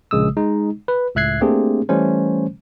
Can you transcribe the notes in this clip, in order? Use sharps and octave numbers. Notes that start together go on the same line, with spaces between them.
A#1 C#3 G#3 D#6 E6
G#3 D#4
B4
C#2 A2 E5 F#6 G#6 C7
A3 A#3 C4 D4 G4 G#4
E3 G3 A3 C#4 C5